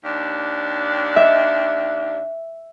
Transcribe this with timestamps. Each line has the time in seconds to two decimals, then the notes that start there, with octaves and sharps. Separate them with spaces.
0.05 D#2 D4
1.16 E5